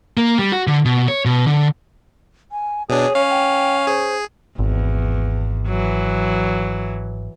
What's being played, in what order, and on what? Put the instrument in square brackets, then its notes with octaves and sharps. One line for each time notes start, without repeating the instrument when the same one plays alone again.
[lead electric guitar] A#3
G3
F#4
D3
B2
C#5
B2
D3
[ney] G#5
[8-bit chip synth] B2 D4 [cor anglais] G#4 [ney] C#5
[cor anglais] C#4 [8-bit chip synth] F5
[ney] G5
[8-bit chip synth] G#4 [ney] C5
[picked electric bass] G#1 [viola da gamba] E2
[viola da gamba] E3 F#3